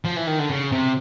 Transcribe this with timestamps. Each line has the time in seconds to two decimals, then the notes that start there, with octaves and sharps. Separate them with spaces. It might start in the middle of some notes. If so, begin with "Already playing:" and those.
0.05 F3
0.16 E3
0.27 D#3
0.39 D3
0.50 C#3
0.72 C3